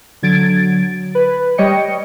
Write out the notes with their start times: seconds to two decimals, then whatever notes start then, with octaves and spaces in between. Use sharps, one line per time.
0.23 D3 F#3 G#6 A6 D7
1.15 B4
1.58 G3 C#5 D#5 G5 C#7